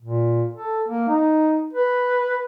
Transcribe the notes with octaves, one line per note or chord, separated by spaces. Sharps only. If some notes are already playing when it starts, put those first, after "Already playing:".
A#2
A4
A#3
D#4
B4